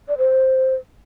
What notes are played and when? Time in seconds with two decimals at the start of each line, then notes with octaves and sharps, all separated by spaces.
0.08 D5
0.18 C5